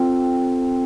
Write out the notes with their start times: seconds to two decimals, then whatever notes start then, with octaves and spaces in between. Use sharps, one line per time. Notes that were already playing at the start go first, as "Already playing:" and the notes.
Already playing: C4 F4 A4